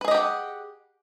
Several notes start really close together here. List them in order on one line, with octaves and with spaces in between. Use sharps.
B4 G#4 D#5 G4 F#5